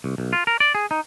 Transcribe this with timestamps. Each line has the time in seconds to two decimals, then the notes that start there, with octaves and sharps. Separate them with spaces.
0.04 C2
0.18 B1
0.33 F4
0.47 A#4
0.60 D5
0.75 G#4
0.91 D#4